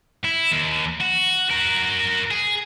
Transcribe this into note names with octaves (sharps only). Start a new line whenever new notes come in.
E4
D#2
F#4
F#4 A#4
G#4